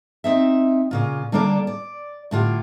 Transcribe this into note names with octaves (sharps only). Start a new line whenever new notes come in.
C4 D#4 E5
A#2 C#3 F4
D3 G3 A#3 D4 A4 D5
D5
A2 D3 F4 G4